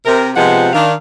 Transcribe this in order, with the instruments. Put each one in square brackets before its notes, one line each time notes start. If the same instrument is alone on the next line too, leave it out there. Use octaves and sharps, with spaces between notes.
[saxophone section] C3 A#4
C3 F3 G#3 B3 F4 F#5
D#3 D4 F5